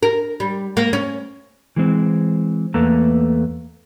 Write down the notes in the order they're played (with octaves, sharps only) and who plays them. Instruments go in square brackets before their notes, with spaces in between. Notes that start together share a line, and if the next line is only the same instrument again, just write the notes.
[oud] A#4
G3
A#3
C#4
[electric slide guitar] E3 G#3 C4
E2 A3 A#3 A4 B4 A#5